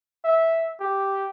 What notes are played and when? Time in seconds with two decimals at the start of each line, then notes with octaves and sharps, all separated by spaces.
0.24 E5
0.80 G4